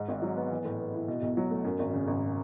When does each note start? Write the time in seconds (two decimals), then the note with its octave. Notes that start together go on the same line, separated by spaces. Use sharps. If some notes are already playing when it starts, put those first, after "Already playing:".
Already playing: G#2
0.09 G#1
0.22 F#3
0.37 B3
0.50 E3
0.65 A2
0.80 B3
0.94 E4
1.08 B2
1.22 B1
1.37 F#3
1.51 A3
1.65 F#2
1.79 G#1
1.93 C#3
2.08 G#1